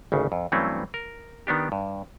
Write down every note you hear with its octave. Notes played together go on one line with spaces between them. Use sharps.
G#1 D2 C#3
F2
G2 E3 F#3 A3 C4 C#4
A#4
D#3 B3 D4 G4
G2